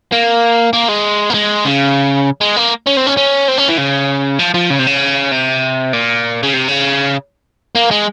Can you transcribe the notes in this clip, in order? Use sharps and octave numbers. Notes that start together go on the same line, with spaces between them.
A#3
A#3
G#3
A#3
G#3
C#3
G#3
A#3
C#4
C4
C#4
C#4
C4
C#4
E3
C#3
F3
F3
C#3
C3
C#3
C3
A#2
C#3
C3
C#3
A#3
G#3